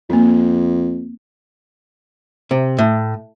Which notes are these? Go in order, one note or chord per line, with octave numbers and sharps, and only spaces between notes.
F2 A#3 C4
C3
A2